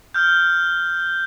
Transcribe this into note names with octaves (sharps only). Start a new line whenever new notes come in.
F6 G6